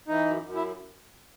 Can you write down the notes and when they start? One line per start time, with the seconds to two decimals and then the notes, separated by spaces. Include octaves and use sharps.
0.08 E3 D#4
0.26 F#2
0.43 F#2
0.55 E4